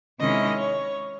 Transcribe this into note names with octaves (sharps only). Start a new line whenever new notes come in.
C3 D#3 G#3 C#4 E4 D#5
C#5